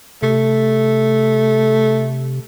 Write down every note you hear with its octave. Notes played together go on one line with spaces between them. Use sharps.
C3 A3